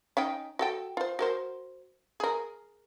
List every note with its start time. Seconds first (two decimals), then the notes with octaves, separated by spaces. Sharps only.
0.17 C#4 D#4 G5
0.59 F#4 A4 G5
0.97 F4 C5
1.19 F#4 A#4 C5
2.20 G#4 A#4